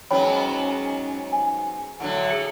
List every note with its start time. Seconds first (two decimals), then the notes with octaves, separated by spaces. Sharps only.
0.11 G#2 F#3 B3 C#4 C#5 G5 B5
1.32 G#5
2.00 A2 D3 F#3 F#5
2.30 G#4 C#7